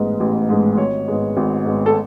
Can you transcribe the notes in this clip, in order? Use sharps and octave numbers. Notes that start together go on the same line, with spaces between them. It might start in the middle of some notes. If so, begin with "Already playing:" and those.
Already playing: A1 G#2 G#3 B3
A1
G#2 G#3 B3
G#1 C#5
G#2 G#3 B3
G#1
G#2 G#3 B3
A4